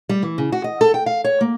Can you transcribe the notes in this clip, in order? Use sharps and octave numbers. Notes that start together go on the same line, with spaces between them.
G3
E3
C#3
F#4
D#5
A4
G5
F5
C#5
A#3